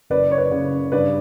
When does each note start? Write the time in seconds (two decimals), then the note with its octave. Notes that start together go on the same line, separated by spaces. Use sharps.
0.10 F#1 B4 D5
0.31 C#5
0.38 B4 D5
0.51 C#3
0.92 G2 B4 D5